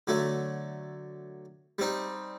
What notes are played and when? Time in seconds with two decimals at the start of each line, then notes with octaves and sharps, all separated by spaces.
0.07 D3 F#3 A3
1.79 G3 C4 D#4